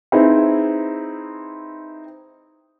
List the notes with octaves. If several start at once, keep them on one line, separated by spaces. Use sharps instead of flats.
C4 D#4 E4 G#4 B4